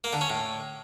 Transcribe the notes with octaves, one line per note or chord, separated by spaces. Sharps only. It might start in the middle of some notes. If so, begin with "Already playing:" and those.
A#3
D3
C#4
A2